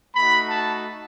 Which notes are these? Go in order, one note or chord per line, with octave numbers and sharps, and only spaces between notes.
A3 D#4 F#4 B5
A5